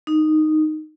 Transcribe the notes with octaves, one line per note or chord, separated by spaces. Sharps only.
D#4